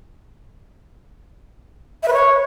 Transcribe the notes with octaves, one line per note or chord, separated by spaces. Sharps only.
E5
B4
C#5